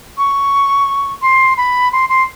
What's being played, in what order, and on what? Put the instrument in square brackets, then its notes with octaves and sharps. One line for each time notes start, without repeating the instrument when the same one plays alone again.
[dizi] C#6
C6
B5
C6
C6